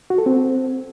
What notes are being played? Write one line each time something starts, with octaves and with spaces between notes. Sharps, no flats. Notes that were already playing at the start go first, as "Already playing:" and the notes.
F#4
A4
C4